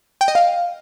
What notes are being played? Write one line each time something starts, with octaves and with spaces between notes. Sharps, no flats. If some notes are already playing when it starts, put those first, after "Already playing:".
G5
D#5
F5